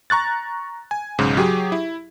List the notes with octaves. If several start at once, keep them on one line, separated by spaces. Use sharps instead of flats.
A#5 C#6 F#6 A6
G#5
B1 G#2 C#3
F#3 G4 G#4
E4